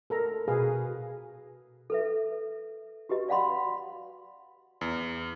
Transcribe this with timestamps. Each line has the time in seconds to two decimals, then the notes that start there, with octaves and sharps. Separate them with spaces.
0.10 A4 A#4 A#5
0.48 B2 G#4 B4 F5
1.90 A4 B4 E5
3.09 F#4 G4 B4 D#5
3.29 D5 F5 F#5 B5 C6
4.81 E2